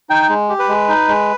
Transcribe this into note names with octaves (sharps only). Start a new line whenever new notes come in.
D#4 G5
G#3
G4
B4
G#3
D#4
G#3